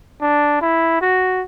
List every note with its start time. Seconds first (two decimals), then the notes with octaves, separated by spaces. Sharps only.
0.21 D4
0.61 E4
1.02 F#4